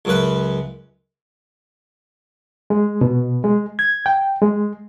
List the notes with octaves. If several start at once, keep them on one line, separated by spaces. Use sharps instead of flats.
C#2 F#2 B4
G#3
B2
G#3
G#6
G5
G#3